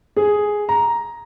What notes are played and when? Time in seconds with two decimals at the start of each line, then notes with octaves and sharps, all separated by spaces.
0.17 G#4
0.69 A#5